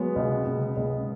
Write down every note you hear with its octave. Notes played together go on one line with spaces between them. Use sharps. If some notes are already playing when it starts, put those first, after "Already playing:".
Already playing: F#3 G#3 B3
C#2
C#2
C#2